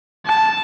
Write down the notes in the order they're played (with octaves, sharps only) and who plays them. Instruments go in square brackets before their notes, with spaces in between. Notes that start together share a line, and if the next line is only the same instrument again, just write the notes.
[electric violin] A5